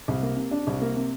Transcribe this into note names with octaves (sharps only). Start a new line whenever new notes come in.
C2
A#3
C3
D4
C2
A#3
C3